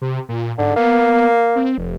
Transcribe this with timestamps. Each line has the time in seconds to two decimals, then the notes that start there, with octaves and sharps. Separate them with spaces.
0.02 C3
0.29 A#2
0.58 G#2 D3
0.76 A#3 B3
1.56 C4
1.78 F1